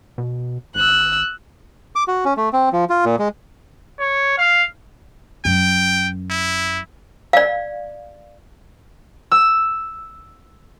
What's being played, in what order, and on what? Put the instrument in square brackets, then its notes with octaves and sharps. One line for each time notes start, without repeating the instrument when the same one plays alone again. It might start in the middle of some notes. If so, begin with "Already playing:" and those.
[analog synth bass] B2
[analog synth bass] G#1 [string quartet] E6 F#6
[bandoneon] D6
F#4
C#4
A3
C4
F3
F4
A#2
G#3
[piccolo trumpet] C#5
F5
[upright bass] F#2 [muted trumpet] G5
[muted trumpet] E4
[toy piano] D5 F5
[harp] E6